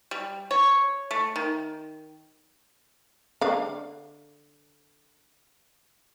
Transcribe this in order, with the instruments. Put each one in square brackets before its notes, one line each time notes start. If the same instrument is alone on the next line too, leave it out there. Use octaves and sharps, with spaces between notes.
[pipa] G3
C#5
A3
D#3
[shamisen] D3 F5